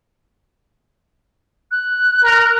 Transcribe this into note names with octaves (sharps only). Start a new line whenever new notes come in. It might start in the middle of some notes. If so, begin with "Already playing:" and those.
F#6
A#4